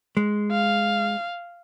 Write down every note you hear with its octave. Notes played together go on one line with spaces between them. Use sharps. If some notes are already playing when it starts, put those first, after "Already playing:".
G#3
F5